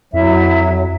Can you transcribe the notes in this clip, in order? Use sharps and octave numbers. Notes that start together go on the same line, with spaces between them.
F2 F#3 E4 E5